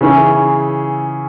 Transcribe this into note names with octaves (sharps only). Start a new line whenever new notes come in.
C#3 E3 C#4 E4 G#4